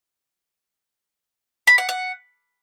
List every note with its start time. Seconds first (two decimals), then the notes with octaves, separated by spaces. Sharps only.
1.67 B5
1.78 F#5
1.89 F#5